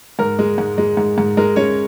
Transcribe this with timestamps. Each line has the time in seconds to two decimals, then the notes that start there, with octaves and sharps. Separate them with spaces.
0.19 G#2 A#4
0.39 G#3
0.58 G#2
0.78 G#3
0.97 G#2
1.18 G#2
1.37 G#3 A#4
1.56 G#3 C#4 C#5